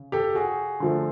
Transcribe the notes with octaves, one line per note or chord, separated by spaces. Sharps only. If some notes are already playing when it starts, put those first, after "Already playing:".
Already playing: C#3
G4 A4
F#4 G#4
D3 F3 A3